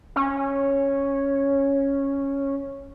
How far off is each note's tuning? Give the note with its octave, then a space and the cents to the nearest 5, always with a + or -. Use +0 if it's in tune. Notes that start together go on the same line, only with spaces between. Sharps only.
C#4 -5